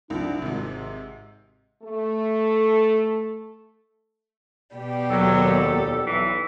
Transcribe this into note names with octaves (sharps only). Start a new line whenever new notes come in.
C2 F3 D4 D#4
G#1 G#2 C3
A3 A4
B2 G3 G4
D#2 F#3 A4
F2 A#2 F#3
B1 E3